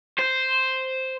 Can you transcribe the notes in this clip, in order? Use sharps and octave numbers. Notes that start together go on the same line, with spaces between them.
C5